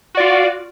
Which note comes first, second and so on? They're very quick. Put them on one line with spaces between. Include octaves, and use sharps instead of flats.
F#4 D5 F4